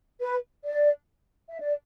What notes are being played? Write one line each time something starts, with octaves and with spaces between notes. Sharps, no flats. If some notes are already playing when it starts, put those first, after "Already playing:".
B4
D5
E5
D5